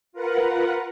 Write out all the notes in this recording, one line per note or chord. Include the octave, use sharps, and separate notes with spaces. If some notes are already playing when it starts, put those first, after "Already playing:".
F4 A#4 B4 F#5